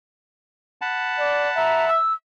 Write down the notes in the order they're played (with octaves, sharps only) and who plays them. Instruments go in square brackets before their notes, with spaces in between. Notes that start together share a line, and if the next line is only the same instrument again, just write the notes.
[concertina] F#5 A5 B5
[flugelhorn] D5
[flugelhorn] E5 [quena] A#5
[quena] E6